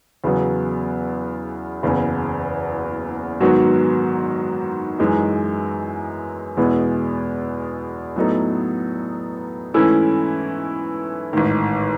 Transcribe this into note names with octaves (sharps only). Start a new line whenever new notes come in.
E2 C#3 F#3 B3
F#1 E2 C#3
G#2 D#3 F#3 B3 F#4
F#2 E3 G#3 D#4
E2 B2 G#3 B3 E4
A2 F#3 B3 D#4 A4
G#2 E3 A3 C#4 E4
A1 G#2 D#3